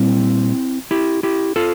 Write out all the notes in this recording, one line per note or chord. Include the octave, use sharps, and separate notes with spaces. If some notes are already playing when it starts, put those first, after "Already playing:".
Already playing: A#2 G3 C4 E4
E4 G4
E4 G4
F4 A4